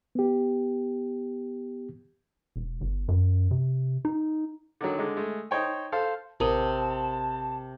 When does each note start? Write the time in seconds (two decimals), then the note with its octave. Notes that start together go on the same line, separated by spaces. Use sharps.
0.15 B3 G4
2.56 E1
2.81 G1
3.08 F#2
3.51 C3
4.05 D#4
4.81 D3 D#3 F#3
4.98 D3 G#3
5.17 G#3 A3
5.51 D#4 C5 C#5 G5
5.92 A4 C5 F5
6.40 A1 C3 A#4 A5 D#6